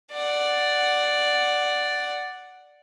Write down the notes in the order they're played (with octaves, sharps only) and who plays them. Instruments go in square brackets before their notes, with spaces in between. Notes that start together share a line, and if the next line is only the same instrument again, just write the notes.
[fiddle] D5 F#5